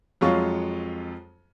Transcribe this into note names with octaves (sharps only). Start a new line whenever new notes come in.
F2 F#3 G#3 F4 C#6